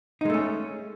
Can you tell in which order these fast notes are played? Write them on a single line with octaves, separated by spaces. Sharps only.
D#4 G#3 A3 C#4